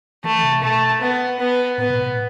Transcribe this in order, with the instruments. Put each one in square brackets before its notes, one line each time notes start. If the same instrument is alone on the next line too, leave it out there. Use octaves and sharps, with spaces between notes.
[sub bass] E3 [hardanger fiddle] A3
[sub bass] C3
[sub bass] B2 [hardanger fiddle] A3
[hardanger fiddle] B3
B3
[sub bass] A2 [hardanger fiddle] B3
[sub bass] B2
A2